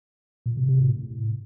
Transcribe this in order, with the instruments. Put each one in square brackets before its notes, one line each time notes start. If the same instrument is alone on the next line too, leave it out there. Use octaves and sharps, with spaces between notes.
[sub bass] A#2
C3
C3
A2